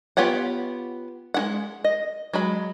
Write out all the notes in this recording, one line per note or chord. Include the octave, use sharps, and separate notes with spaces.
B3 F4 G4 C#5 F#5
G#3 E4 F#5
D#5
F#3 G#3 B5